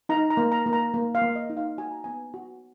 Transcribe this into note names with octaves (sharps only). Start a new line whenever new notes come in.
D#4 A#5
A#5
A#3
A#5
A#3
A#5
A#3
F5
A#3
D#5
D#4
F5
F#4 G#5
A#5
B3 G#5
F#4